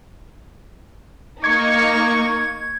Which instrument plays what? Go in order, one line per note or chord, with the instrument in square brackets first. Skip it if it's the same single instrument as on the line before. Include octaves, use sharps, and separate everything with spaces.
[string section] A#3 D#4 [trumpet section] C#6 [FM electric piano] G#6